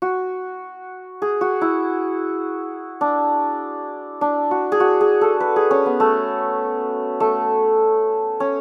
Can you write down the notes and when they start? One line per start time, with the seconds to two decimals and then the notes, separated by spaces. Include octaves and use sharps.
0.02 F#4
1.22 G#4
1.41 F#4
1.61 E4
3.01 D4
4.21 D4
4.51 F#4
4.72 G#4
4.80 F#4
5.01 G#4
5.21 A4
5.40 B4
5.56 G#4
5.71 C#4
5.86 B3
6.00 A3
7.20 A3
8.40 C#4